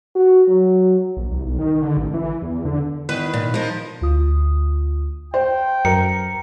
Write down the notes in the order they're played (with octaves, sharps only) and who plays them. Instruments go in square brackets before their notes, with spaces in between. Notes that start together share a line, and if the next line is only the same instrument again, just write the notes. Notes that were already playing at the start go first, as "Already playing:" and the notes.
[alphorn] F#4
F#3
[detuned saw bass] A#1
C2
B1
D#3
D3
A1
E3
E2
D3
[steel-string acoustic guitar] E2 [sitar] D#3 B4
[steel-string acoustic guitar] A#2
[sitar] F3 [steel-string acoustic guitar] D#4 A#4
[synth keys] D2 F4 D#6
[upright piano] C5 [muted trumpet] G5
[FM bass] F#2 [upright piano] A#4 [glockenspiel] C#7